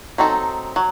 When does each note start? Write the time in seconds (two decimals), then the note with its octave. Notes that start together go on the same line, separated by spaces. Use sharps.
0.18 F#3 C4 D#4 A4
0.76 F#3